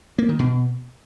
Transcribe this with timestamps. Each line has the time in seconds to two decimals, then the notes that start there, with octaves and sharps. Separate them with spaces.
0.18 A#3
0.29 D#3
0.39 B2